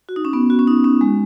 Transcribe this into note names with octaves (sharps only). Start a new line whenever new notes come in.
F#4
D#4
C#4
B3
F#4
C#4
D#4
C#4
G#3